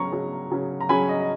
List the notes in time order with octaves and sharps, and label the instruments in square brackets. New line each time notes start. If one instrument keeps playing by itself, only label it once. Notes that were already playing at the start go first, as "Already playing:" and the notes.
Already playing: [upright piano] C#3 F#3 C#4 A#5 C#6
C#3 F#3 C#4
C#3 F#3 C#4
A#5
C#3 F#3 C#4 G#5 B5
D#5
D#5